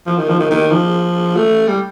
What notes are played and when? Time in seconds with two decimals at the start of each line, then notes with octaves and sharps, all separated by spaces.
0.06 F3
0.18 D#3
0.29 F3
0.40 D#3
0.51 D#3
0.71 F3
1.36 A3
1.67 G3